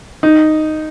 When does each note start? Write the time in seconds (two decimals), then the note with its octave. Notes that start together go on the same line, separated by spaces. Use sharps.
0.23 D#4